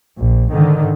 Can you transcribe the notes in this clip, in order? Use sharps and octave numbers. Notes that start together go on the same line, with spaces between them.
A#1
G#2 D3 D#3